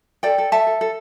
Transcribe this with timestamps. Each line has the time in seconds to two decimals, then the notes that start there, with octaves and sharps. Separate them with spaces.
0.23 A4 D5 G5
0.38 A4
0.52 A4 E5 A5
0.67 A4
0.81 A4